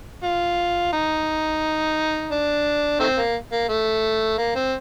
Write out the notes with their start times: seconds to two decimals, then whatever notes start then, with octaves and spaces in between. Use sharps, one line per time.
0.23 F4
0.93 D#4
2.31 D4
3.00 D#3 A3 C4
3.17 A#3
3.52 A#3
3.69 A3
4.38 A#3
4.55 C4